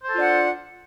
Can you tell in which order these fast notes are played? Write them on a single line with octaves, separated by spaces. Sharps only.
C5 A4 F4 D4 F#5